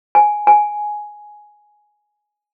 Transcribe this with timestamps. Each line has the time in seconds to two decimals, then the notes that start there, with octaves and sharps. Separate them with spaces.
0.15 G#5
0.47 G#5